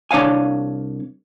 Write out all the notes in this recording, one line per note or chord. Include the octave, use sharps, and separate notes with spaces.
C2 D4 C#5 F5 G#5